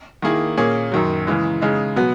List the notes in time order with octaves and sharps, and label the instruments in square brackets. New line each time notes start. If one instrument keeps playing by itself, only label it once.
[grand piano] D#3 A#3 E4 G#4
A#2 A#3 C#4 G#4
F#2 D#3 F#3
C#3 E3 G#3
C#3 G#3 D#4
B2 F#3 B3